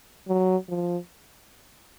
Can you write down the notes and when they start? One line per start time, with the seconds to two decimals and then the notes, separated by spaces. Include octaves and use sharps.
0.28 F#3
0.69 F3